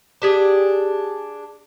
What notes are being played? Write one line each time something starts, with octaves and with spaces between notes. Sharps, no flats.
D4 G4 G#4